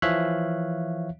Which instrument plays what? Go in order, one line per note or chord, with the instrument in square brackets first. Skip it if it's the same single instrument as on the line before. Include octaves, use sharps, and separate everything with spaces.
[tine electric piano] E3 F3 C#5 E5 F5 F#6